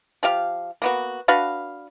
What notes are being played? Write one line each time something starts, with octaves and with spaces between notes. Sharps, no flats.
F3 G4 F5
A#3 B3 F#4
D4 F#4 B4 F5